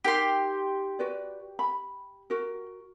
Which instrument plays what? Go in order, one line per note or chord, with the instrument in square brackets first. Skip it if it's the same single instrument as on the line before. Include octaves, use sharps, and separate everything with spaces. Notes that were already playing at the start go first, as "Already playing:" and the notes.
[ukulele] D#4 A#4 [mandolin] G4 C6
[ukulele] F#4 B4 D5
B5
F#4 A#4